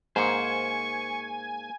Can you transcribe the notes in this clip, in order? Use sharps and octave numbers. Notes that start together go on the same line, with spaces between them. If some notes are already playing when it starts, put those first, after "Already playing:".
G#2 A#3 C5 G#5 C#6